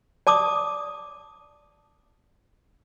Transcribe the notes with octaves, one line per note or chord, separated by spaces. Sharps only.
D5 A5 D6 D#6